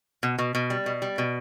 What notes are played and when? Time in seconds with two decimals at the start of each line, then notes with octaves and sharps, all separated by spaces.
0.23 B2
0.39 B2
0.55 B2
0.70 G3
0.86 B2
1.02 G3
1.18 B2